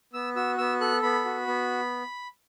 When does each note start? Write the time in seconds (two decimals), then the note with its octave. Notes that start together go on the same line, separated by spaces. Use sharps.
0.13 B3 E6
0.36 F#4 E6
0.58 B3 E6
0.81 A4 F#6
1.03 B3 B5
1.25 F#4
1.47 B3